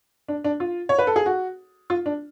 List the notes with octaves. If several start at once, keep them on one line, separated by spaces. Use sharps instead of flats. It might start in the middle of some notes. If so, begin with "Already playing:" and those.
D4
D4
F4
C#5
B4
A4
G#4
F#4
F4
D4